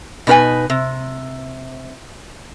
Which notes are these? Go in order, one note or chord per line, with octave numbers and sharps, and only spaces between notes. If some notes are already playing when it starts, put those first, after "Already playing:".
B2 D#4 A#4 B4 G#5
C3